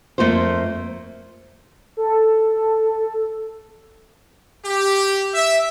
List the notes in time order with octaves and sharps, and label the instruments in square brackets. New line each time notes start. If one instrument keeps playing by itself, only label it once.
[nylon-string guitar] F2 C3 A3 A#3 F4 C5
[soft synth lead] A4
[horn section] G4
E5